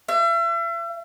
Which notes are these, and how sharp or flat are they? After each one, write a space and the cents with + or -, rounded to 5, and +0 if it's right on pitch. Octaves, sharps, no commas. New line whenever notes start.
E5 +40